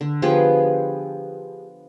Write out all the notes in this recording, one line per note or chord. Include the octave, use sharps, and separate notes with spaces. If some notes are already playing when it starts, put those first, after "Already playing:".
D3
F3 B3 G4 G#4